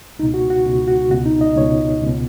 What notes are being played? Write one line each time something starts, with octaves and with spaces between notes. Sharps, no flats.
C#2 B2 D#4
F#4
F#4
C#2 B2
F#4
C#2 B2 F#4
D#4
D#5
C#2 B2 C#5
C#2 B2